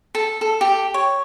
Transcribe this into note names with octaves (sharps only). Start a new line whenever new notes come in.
A4
A4
G4
C#5